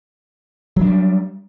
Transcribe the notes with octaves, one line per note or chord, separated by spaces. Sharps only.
F#3 G3 D4